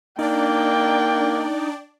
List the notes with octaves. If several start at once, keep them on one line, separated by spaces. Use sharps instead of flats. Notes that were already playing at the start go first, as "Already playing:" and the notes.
A#3 D4 D#4 D5 G5